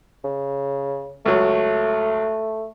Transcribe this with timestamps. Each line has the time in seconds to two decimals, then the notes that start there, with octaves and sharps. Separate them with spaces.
0.24 C#3
1.26 C#2 F#3 A3